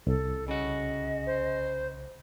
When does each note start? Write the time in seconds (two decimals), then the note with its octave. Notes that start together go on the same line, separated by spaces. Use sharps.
0.07 C2 A4
0.48 C#3 F#4 D#5
1.27 C5